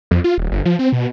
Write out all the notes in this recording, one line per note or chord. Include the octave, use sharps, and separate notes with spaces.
F2
F4
D#1
G1
F3
C4
B2